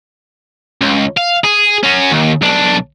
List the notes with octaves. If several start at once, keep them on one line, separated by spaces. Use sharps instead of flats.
C#2
F5
G#4
C#4 F#4
D#2
B1 D4